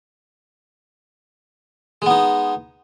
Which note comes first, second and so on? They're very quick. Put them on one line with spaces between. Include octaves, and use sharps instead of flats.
G#3 B3 D#4